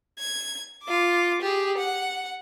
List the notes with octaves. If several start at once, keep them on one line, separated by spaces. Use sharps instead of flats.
G#6
F4 D6
G4 G#4
F#5